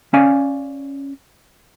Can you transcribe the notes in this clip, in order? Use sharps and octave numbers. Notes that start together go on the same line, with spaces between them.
C#4 D5 F5 G#5